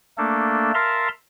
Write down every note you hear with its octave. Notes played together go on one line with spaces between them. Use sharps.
A3 A#3 D4 A4
A#4 E5 F5 A5 A#5 C6